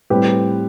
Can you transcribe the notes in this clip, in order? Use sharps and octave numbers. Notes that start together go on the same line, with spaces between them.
A2 G3 C4 G4 B4